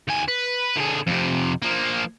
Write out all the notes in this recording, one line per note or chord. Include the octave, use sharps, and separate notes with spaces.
D#2 G#5
B4
D3 G#4
F2 C3
F3 A#3